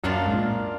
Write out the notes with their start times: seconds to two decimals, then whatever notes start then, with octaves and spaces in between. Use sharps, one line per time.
0.04 F#2 A#3 D4 F4
0.26 G#2
0.33 A#2